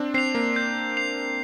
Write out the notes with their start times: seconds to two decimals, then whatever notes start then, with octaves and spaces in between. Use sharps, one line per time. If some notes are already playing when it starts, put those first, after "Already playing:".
Already playing: C4 D4
0.14 C4 C7 F7
0.35 A#3
0.56 G6
0.97 C7 F7